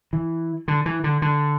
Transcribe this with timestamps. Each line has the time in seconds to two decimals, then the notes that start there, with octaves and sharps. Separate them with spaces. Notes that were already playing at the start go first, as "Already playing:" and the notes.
0.13 E3
0.68 D3
0.86 E3
1.04 D3
1.22 D3